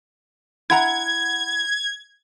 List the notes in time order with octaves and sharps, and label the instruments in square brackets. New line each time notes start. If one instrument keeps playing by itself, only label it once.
[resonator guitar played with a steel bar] E4 F#5 A#5 [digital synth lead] G#6